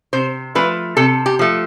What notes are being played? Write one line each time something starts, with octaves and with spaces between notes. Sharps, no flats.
C3 C5
F3 A3 B4
C3 A4
G4
F3 A3